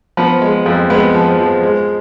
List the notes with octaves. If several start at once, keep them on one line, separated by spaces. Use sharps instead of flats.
F3 B3 B4
G#3
F2
G#3 B3 B4
F3
F3
G#3